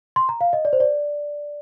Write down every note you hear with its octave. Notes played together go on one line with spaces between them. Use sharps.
C6
A#5
F5
D#5
D5
C5
D5